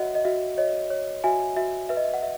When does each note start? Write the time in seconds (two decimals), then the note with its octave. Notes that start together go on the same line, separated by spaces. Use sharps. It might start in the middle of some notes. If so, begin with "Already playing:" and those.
Already playing: F#4 C#5 D#5 E5 F#5
0.15 D#5
0.25 F#4 E5
0.58 C#5 D#5
0.90 C#5
1.24 F#4 E5 G#5
1.57 F#4 E5
1.89 B4 E5
1.97 D#5
2.04 E5
2.14 F#5
2.22 E5